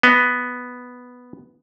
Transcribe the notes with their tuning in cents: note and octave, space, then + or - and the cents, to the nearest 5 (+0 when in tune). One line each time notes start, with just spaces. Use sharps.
B3 +0 D#5 +10